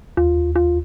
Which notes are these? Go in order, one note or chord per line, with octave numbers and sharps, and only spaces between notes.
D#2 F4
F4